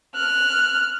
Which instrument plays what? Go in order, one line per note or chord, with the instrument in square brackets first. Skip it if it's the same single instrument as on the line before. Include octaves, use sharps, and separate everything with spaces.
[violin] F6 F#6